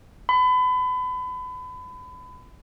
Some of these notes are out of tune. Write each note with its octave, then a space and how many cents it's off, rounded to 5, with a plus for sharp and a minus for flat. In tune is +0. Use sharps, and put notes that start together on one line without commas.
B5 +30